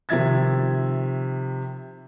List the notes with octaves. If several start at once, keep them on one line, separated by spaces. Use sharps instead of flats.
C3 D#3 F3 E5 G#6 A6